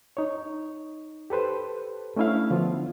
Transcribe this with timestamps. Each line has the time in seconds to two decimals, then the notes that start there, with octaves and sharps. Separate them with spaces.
0.17 D#4 C#5
1.30 G4 A4 B4 C5
2.16 A3 C#4 D4 E4 E5 F5
2.50 D3 F3 B3 F4